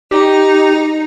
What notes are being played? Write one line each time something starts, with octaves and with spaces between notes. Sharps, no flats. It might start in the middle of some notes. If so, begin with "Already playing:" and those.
D#4 G4